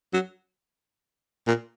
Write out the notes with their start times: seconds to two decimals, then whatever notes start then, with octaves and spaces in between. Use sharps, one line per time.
0.13 F#3
1.47 A#2